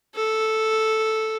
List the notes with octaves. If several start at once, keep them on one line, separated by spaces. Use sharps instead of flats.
A4